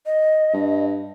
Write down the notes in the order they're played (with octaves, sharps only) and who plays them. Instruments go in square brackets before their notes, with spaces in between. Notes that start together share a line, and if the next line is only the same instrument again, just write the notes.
[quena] D#5
[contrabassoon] G2